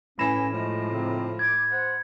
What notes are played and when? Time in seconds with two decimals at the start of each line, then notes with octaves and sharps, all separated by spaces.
0.19 A2 E3 C#4 B5 A#6 E7
0.53 F3 G#3 A3
0.91 G#2 C#3 C4
1.39 D6 G#6
1.71 C5 F#5